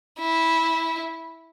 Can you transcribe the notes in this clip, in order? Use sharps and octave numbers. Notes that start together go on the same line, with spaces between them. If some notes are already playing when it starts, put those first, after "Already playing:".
E4